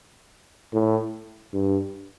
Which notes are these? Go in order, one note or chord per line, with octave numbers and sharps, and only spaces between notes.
A2
G2